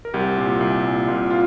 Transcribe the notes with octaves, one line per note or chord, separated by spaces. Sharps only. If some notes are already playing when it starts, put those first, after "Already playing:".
A#4
C2 G4
A#2
C2
A#2
C2 F4
F4